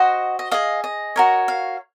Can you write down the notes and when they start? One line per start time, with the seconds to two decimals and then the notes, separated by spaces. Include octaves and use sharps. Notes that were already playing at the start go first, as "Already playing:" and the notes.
Already playing: F#4 C5 D#5 F#5
0.39 D#5
0.51 G#4 D#5 F5
0.84 D#5
1.16 F#4 A#4 C#5
1.48 F5